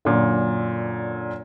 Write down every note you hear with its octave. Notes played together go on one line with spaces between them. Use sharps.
F#2 A#2 D3